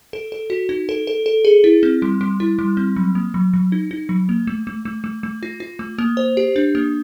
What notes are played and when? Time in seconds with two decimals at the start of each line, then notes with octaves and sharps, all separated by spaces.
0.13 A4
0.32 A4
0.50 F#4
0.69 D#4
0.89 A4
1.07 A4
1.26 A4
1.45 G#4
1.64 E4
1.83 C4
2.02 G3
2.21 G3
2.40 E4
2.59 G3
2.77 C4
2.96 F#3
3.15 A#3
3.34 F#3
3.54 F#3
3.72 D#4
3.91 D#4
4.09 F#3
4.29 A#3
4.47 A3
4.67 A3
4.85 A3
5.04 A3
5.23 A3
5.43 F4
5.60 F4
5.79 A3
5.99 A#3
6.17 C5
6.37 G4
6.56 D4
6.75 A#3